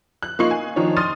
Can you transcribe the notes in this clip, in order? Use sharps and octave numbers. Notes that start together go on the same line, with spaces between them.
F#6
A#3 D#4 F4 C#6 C7 F#7
G#5
D#3 F3 D4 D#4 C#5
C6 D#6 F6 A6 D#7